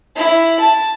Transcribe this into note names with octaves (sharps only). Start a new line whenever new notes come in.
E4
A5